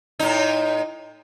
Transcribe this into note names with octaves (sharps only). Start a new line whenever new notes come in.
A2 D#4